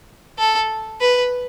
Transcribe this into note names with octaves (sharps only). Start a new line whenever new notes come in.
A4
B4